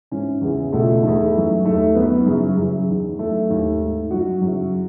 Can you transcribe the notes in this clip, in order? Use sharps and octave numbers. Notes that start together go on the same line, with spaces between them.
G#2 E3 C#4
E2 C#3 E3
C#2 B2 A3
E2 D#3 A3
F#2 E3
D#2 D#3 A3
F#2 D#3 B3
F#2 C#3 E3
F#2 C#3 E3
E2 D#3
F#2 E3 A3
D#2 D#3
G#2 D#3
F#2 D#3 F#4
F#2 C#3 E3